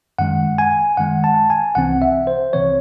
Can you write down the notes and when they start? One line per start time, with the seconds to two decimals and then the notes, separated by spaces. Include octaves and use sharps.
0.19 F#2 D#3 G#3 F#5
0.58 G#5
0.97 F#2 D#3 G#3 F#5
1.24 A5
1.50 G#5
1.75 C2 C3 E3 C4 F#5
2.02 E5
2.27 C5
2.53 C2 C3 E3 C4 C#5